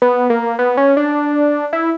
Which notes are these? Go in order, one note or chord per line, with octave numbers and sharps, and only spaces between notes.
B3
A#3
B3
C#4
D4
E4